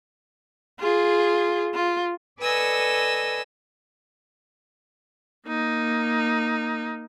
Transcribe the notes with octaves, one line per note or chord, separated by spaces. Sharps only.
F4 G#4
F4
A4 B4 D5 D#5 G#5 E6
A#3 D#4